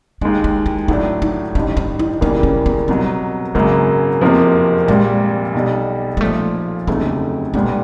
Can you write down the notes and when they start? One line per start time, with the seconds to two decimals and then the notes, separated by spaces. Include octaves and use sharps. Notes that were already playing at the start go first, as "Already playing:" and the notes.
0.21 D#2 D#3 G#3 D4
0.44 D#4
0.66 E4
0.88 A2 F#3 A3 D4 D#4
1.22 D#4
1.55 A1 G2 D#3 E4
1.77 D#4
1.99 E4
2.21 E2 C#3 E3 G3 A#3 D#4
2.43 C#4
2.66 B3
2.88 C2 B2 F#3 G3
3.55 G#1 F#2 C#3 F#3 G#3 A#3
4.21 F1 E2 C3 F3 A#3
4.88 A#1 A#2 G3 G#3
5.55 B1 B2 G3
6.17 G#3
6.21 B1 A#2 F3 A3
6.87 F1 D#2 C#3 F#3 A3 A#3
7.54 B1 A#2 G3 G#3 B3